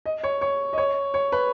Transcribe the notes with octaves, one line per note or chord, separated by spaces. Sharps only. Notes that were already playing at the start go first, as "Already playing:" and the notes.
D#5
C#5
C#5
D#5
C#5
C#5
B4